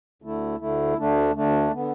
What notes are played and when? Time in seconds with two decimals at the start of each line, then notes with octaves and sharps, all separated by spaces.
0.22 D2 D3 A3 E4
0.59 D2 D3 A3 E4
0.97 D2 D3 A3 D4
1.35 D2 D3 A3 D4
1.73 D3 B3